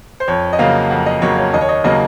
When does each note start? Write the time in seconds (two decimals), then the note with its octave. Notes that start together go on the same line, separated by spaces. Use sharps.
0.20 C5
0.28 F2 C#5
0.53 D#5
0.59 C#3 F#3 A#3 F5
0.90 F2 F#5
1.06 D#5
1.22 C#3 F#3 A#3 C#5
1.38 C#5
1.54 D#2 D#5
1.61 C#5
1.69 D#5
1.84 C#3 F#3 A#3 D#5